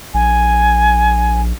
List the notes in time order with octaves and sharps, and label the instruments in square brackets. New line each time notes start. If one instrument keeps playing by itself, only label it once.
[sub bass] A#1 [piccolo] G#5